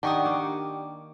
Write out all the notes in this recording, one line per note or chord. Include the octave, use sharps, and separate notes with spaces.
D#3 D4 G4 F#5 C#6 D#6
A#3 D6